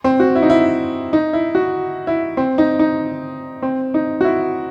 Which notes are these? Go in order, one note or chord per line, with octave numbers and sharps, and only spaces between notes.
C4
F#4
E4
D#4
E4
D#4
E4
F#4
E4
C4
D#4
D#4
C4
D#4
F#4
E4